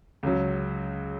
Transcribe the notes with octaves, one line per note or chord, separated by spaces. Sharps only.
C#2 C#3 F#3